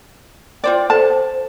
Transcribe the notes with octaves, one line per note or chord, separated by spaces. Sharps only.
F4 C5 D5 G5
A4 C5 A5